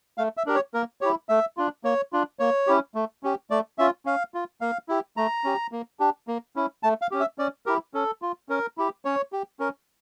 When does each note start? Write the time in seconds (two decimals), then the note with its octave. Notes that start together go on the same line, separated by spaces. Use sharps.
0.18 A3 F5
0.37 E5
0.46 D4 G4 A#4
0.55 C#5
0.74 A#3 A#4
1.01 E4 G4 C#5
1.29 A3 E5
1.57 D4 F4
1.84 A#3 C#5
2.13 D4 F4
2.39 A#3 C#5
2.67 C#4 E4 G4
2.95 A3
3.23 C#4 G4
3.50 A3 D5
3.78 C#4 F4 E5
4.05 C#4 F5
4.34 F4
4.61 A#3 F5
4.89 E4 G4
5.17 A3 A#5
5.44 C#4 G4
5.72 A#3
6.00 D4 G4
6.28 A#3
6.56 C#4 E4
6.83 A3 A5
7.02 F5
7.11 C#4 G4
7.20 E5
7.38 C#4 D5
7.66 E4 G4 A#4
7.94 C#4 A4
8.22 F4
8.49 C#4 A#4
8.78 E4 G4
9.05 C#4 C#5
9.33 G4
9.60 C#4 A#4